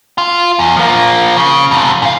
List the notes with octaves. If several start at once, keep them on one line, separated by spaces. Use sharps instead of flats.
F4
E2
F3 A#3
C#3
F2 C3
G#2 F5